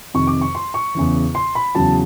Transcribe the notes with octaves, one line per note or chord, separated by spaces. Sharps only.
F2 C3 D#3 C#6
D6
C#6
C6
C#6
E2 C#3 E3
C6
B5
E2 C#3 F#3 A5